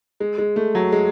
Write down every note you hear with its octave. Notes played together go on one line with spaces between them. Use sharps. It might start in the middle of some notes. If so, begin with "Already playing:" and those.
G#3
G#3
A3
F#3
G#3